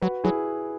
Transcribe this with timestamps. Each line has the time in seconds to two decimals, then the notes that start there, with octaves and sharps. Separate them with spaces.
0.01 F#3 F#4 B4
0.24 F#3 E4 G#4